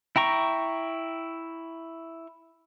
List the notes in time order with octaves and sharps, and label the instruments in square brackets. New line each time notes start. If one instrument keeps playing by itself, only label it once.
[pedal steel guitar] E4 G5 A#5 C#6